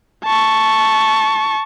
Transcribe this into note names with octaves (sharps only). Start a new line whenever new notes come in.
A5 C#6